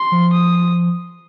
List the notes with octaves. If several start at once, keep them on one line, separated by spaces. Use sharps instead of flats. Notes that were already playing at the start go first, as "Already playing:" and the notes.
Already playing: C6
F3
D#6